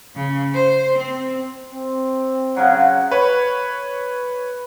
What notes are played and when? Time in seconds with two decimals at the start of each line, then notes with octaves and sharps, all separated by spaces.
0.15 C#3
0.54 C5
0.98 C4
1.71 C4
2.57 C#3 F#3 F#5
3.11 B4 C#5